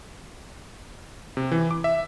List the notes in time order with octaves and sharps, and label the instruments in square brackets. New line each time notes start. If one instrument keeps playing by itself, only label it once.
[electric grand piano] C3
E3
D6
E5